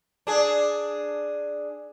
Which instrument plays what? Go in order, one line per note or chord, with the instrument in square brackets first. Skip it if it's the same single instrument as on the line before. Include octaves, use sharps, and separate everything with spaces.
[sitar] D4 G#4